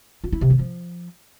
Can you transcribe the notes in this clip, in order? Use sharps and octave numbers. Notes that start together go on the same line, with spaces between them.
F4
E4
C3
E3
F3